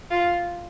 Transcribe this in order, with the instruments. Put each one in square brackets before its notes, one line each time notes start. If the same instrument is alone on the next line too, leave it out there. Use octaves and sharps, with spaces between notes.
[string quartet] F4